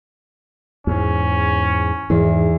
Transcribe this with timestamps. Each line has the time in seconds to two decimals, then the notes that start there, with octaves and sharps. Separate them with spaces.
0.87 E2 G#2 C#4
2.10 E2 G#2